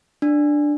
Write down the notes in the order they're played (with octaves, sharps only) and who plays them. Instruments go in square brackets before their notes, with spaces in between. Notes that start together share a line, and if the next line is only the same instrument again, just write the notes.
[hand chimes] D4